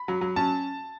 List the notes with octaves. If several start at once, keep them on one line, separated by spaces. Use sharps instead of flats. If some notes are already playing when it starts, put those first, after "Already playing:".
Already playing: B5
F#3
F#3
C#4 A5